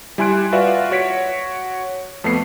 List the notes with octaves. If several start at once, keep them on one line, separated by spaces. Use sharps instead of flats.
G3 E4 G#5 C6 F#6 D7
F4 F#4 B4 D5 E5 F5
F#4 C#5 B6 D7
F2 A3 B3 C7